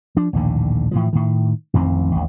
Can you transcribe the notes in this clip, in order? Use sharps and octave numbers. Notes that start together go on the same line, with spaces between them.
F3 D4
A#1 D#2 A2 D3
A2 E3 F3
A2 D#3
A1 F2 D#3 C4
A1 D#2